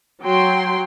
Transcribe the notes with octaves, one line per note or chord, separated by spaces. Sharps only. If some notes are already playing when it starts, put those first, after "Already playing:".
F#3 G5 C6